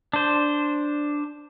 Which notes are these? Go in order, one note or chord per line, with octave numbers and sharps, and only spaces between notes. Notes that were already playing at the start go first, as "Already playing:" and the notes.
D4 C5